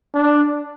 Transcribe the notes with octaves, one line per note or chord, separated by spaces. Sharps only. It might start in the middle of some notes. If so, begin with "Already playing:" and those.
D4